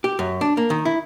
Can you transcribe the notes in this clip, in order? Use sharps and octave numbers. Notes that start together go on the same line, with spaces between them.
G4
F#2
D4
A#3
D#3
E4